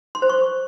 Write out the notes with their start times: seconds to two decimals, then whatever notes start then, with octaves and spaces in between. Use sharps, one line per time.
0.15 C6
0.22 C5
0.29 C#6